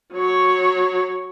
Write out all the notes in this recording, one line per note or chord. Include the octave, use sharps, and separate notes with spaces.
F#3 C#5